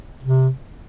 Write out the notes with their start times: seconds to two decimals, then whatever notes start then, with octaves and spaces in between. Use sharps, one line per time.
0.23 C3